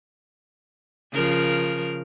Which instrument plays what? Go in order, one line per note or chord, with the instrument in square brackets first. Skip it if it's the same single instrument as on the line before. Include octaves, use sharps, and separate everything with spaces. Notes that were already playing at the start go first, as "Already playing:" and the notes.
[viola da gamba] C#3 F3 A#4